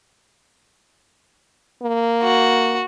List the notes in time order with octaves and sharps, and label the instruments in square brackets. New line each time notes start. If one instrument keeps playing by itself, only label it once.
[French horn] A#3
[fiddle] F#4